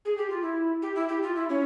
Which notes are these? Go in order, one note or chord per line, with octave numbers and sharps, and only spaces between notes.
G#4
G4
F4
E4
G4
E4
G4
F4
E4
C#4